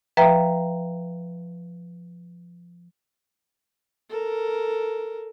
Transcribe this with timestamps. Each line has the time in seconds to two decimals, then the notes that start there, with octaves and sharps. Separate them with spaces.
0.17 F3 B4 E5 G5 A#5
4.09 A4 A#4